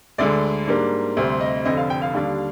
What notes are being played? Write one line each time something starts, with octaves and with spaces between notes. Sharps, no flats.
D2 D3 G#3 D5
G#2 G3 A#3 D4
D2 C3 G3 C4
D#5
F1 F2 D3 D#5
F5
G5
F5
D#2 D3 G3 D4